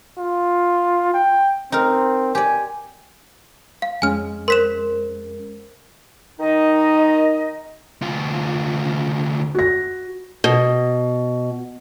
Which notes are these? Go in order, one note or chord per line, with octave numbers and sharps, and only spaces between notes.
F4
G5
C4 D#4 A#4
G4 D5 G#5
F5
F2 G#3 C#4 G#5 F6
A#4 C5 C6 B6 E7
D#3 D#4 D#5
D2 F4
F#4 A#6
B2